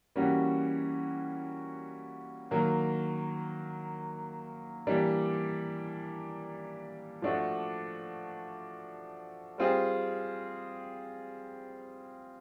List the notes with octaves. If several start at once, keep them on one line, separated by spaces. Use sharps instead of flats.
E3 G3 A#3 C#4 F#4
D#3 F#3 A#3
E3 G3 A#3 D4
F3 A3 D4 F#4
G3 C4 F4 G#4